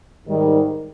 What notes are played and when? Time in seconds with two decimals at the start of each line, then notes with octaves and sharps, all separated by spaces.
0.25 G#2 D#3 G3